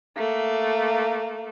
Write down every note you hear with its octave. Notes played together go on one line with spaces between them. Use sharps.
A3 A#3